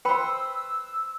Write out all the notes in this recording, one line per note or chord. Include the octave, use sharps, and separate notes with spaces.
B4 C5 G5 B5 E6